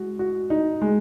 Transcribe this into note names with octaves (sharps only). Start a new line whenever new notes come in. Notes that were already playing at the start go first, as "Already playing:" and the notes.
Already playing: G#3 F#4
F#4
D#4
G#3